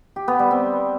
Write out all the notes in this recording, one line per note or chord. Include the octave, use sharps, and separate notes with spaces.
G4
B3
G3
C4